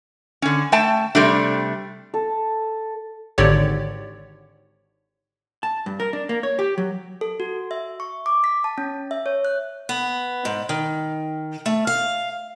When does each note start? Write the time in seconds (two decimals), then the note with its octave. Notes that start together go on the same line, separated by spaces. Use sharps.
0.42 D3 C#4
0.72 A3 G5 A5
1.15 C3 G3 A3 D4
2.14 A4
3.38 G#1 G#2 D3 G4 C#5 D5
5.63 A5
5.86 G2
6.00 A#4
6.13 D4
6.29 A#3
6.43 C#5
6.59 G4
6.78 F#3
7.21 A4
7.40 F#4
7.71 E5
8.00 C#6
8.26 D6
8.44 B6
8.64 A5
8.78 C#4
9.11 E5
9.26 C#5
9.45 F#6
9.89 B3
10.45 G#2
10.69 D#3
11.66 A3
11.87 F5